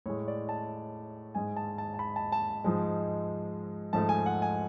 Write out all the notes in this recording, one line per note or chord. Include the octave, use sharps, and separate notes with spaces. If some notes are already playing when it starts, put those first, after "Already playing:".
A2 G#3 C#5
D5
A5
G#2 G#3 G#5
A5
A5
A5
B5
A5
A5
G#2 F3 G#3
G#2 F3 A3 A5
G#5
F#5
G#5